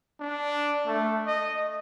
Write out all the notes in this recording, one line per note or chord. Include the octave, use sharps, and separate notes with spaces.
D4
A3
D#5